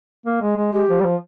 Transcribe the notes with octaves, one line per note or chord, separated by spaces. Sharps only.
A#3
G#3
G#3
G#3 G4
F3
G3
F3